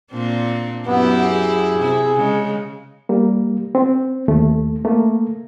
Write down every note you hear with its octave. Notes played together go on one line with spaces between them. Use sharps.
A#2 C4 D4
F#2 B3 E4 G4
G#4
C3 E4
C#3 G#3
G3 A#3
C4
D#2 A3
A3 A#3